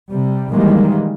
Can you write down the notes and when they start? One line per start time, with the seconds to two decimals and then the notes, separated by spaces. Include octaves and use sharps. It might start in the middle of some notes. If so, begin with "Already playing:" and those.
0.10 C3 G3
0.51 D#3 E3 G3 G#3 A#3